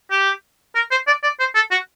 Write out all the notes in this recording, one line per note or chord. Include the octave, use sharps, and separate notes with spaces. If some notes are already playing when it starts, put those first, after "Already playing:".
G4
A#4
C5
D5
D5
C5
A4
F#4